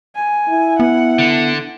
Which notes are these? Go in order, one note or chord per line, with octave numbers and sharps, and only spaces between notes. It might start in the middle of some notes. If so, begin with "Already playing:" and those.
G#5
E4
B3 F#5
D3